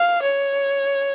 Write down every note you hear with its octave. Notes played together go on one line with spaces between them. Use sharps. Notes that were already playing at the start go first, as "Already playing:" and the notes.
Already playing: F5
C#5